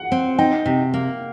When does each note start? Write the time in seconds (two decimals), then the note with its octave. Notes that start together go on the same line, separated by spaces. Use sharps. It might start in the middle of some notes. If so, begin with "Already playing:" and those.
Already playing: F#5
0.12 C4
0.38 D#4 G5
0.66 C3
0.94 A#3